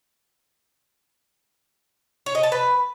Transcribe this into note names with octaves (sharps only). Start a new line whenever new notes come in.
C#5
D#5
A5
B4